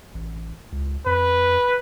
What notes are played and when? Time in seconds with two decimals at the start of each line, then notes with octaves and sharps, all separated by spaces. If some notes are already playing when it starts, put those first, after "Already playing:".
0.14 A1
0.72 C#2
1.06 F2 B4